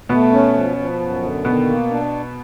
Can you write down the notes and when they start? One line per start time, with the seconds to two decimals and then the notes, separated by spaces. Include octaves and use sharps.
0.09 B2 A3 B3
0.32 C#4
0.54 F3
0.77 F3
0.99 F#2
1.22 D3
1.45 B2 D#3 B3
1.67 A#3
1.90 D4